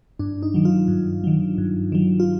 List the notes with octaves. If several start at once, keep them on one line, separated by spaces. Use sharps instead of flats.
G2 D4
D#4
D#3 F#3
F4
G2
D#3 F#3
G2
D#3 F#3
F4